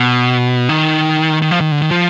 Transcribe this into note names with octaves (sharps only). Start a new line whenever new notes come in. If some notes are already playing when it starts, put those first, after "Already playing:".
Already playing: B2
D#3
D#3
F3
D#3
D3
D#3
F3